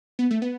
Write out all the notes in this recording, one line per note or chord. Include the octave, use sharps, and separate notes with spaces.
B3
A3
B3